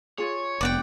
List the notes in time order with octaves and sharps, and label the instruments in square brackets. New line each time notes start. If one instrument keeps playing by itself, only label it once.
[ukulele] F4 G#4 [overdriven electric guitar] C#5
[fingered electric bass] F1 B3 [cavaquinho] D5 F#5 G5